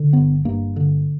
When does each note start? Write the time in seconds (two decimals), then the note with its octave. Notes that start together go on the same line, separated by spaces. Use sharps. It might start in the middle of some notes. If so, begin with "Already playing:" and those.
Already playing: D3
0.13 G1 B3
0.45 G2 A#3
0.76 D3